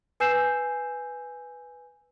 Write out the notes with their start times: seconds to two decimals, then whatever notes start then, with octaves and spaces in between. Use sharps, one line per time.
0.20 B4 G#5 E6 G6 C7 E7